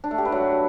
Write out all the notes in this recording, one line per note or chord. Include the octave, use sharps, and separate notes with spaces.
D4
A3
G4
B4
F#3